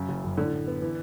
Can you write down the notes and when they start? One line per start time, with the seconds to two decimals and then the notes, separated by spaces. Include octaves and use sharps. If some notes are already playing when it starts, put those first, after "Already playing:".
Already playing: F#2 C#3
0.08 F#1
0.24 F#1
0.38 A2 D3
0.52 A2
0.67 B3
0.82 E3